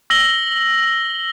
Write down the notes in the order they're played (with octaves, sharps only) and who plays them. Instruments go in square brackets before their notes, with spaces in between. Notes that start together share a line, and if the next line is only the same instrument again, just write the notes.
[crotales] E6 A#6 F#7 G7